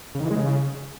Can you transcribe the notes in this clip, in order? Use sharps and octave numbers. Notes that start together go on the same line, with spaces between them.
C#3
D#3
E3
G#3
C#3